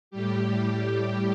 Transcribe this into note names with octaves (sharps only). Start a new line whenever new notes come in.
A2 G3 G4